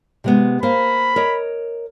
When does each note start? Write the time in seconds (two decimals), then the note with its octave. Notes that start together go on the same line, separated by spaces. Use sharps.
0.24 C3 G#3 B3
0.63 A#3 A#4 C5 B5
1.16 A#4 C#5 D#5